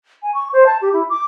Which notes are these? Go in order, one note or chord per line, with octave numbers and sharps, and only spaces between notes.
G#5
C#6
C5
A5
G4
E4
D6